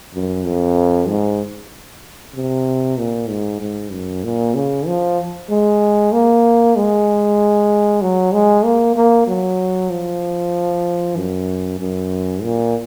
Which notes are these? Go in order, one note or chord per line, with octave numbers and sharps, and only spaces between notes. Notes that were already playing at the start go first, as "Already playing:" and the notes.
F#2
F2
G#2
C3
A#2
G#2
G#2
F#2
A#2
C#3
F3
G#3
A#3
G#3
F#3
G#3
A#3
A#3
F#3
F3
F#2
F#2
A#2